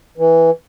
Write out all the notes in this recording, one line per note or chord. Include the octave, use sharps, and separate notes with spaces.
E3